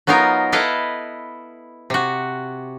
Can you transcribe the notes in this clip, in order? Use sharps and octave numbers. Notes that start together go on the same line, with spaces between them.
F#3 B3 D#4 F4 A#4
E4 A4 B4 D#5 F5
C3 F#4